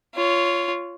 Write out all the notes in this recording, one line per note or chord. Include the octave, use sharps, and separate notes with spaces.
F4 C#5